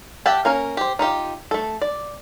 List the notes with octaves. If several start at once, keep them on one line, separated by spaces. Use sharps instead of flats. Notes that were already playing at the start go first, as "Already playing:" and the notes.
G4 E5 F#5 G5 A5
A#3 C#4 A#4
G4 C5
D#4 F4 G4
A3 A4
D5